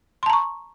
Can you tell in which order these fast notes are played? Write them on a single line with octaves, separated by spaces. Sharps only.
C6 A5 A#5 C#6